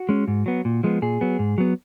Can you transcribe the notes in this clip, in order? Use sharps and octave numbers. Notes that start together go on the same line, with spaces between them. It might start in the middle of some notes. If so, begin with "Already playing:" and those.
Already playing: F#4
G#3 C#4
G#2
F#3 B3
A#2
F3 G#3 B3
A#2 G#4
F#3 B3
G#2
F#3 B3